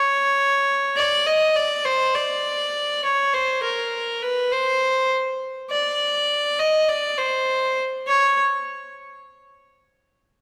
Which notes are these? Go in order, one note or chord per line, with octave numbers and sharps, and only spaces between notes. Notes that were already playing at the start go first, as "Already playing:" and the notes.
Already playing: C#5
D5
D#5
D5
C5
D5
C#5
C5
A#4
B4
C5
D5
D#5
D5
C5
C#5